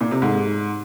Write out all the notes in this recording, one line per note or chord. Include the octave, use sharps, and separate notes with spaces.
A#2
C3
G#2